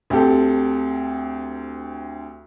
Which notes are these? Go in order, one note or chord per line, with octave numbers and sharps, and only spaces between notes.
D2 C4 G4 A4